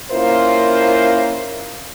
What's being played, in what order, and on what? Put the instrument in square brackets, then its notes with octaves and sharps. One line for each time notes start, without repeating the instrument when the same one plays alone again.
[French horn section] A#3 C#4 E4 F4 A#4 C5